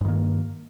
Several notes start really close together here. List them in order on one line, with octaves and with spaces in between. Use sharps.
G2 D#3 A#3